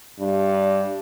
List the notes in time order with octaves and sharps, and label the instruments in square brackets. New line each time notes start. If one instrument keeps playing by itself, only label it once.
[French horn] G2